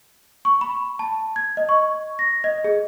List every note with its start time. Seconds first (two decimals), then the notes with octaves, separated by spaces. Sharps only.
0.45 C#6
0.61 B5
0.99 A5
1.36 G#6
1.57 D#5
1.69 C#6
2.19 A#6
2.44 D#5
2.64 G#4